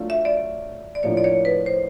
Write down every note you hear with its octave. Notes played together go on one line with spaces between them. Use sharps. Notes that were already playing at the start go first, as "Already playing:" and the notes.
Already playing: F#3 A3 D4 F4
E5
D5
D5
A2 F3 A#3 D4 F4 C#5
D5
C#5
B4
C5